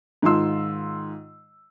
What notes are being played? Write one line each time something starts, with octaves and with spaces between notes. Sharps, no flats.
G#2 D#3 F4 C6 E6